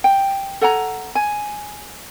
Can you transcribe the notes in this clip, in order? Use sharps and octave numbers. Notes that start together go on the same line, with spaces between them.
G5
A4 F#5 G#5 A#5
G#5